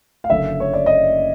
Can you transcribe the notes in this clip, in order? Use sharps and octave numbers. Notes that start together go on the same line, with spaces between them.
F5
F#1 F#2 D3 E5
C#5
D5
D#5